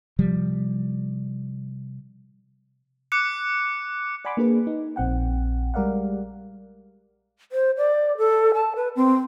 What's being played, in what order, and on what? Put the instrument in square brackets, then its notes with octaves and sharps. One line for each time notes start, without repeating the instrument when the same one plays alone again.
[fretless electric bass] C3 F3 G3
[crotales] D6 F#6 C#7
[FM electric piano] D5 F#5 G#5 B5 C6 D6
A#3 D4 G#4 B4
D#4
A#1 C4 F#5 G5
G3 G#3 A#4 D5 F5 F#5
[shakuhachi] C5
D5
A4
A5
B4
C4